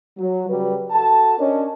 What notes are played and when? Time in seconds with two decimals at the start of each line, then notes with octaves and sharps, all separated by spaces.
0.18 F#3
0.49 C#3 G3 F#4 B4
0.92 F#4 A4 A5
1.39 C#4 D4 A#4 C#5 D#5